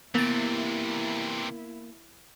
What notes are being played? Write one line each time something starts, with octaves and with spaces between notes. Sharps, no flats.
C3 E3 A#3 B3 E4 A6